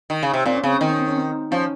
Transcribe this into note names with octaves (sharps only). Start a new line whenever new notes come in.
D#3
C#3
C3
A#2 C4
C#4
C#3 C4
C#4
D#3 C4
C#4
C4
C#4
C4
F3 C#4